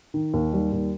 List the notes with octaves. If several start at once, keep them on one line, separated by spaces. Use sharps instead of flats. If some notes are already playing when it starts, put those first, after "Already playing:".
D#3
D#2
G3
D#2